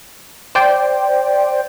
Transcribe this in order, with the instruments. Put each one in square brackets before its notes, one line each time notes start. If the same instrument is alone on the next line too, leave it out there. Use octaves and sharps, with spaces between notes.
[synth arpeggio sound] C5 D5 G5